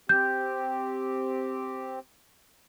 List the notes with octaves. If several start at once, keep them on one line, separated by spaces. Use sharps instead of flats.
C4 G4 G6